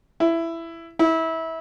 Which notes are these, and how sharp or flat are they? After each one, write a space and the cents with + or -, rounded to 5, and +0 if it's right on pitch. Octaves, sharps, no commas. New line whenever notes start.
E4 +10
E4 -25